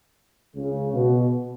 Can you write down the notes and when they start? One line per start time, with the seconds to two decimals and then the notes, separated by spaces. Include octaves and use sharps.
0.55 C#2 C#3
0.92 B2